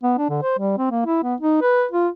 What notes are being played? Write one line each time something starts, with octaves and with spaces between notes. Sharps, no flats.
B3
D4
D3
C5
G3
C4
A#3
E4
B3
D#4
B4
F4